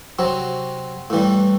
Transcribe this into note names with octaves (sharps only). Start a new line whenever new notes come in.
C3 F#3 C4
A2 E3 G3